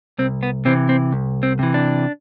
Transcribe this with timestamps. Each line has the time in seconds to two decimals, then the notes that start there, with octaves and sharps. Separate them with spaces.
0.19 C2 C4
0.43 B3
0.65 C3 E3 C4
0.89 C4
1.13 C2
1.43 C4
1.59 C3 E3
1.74 D4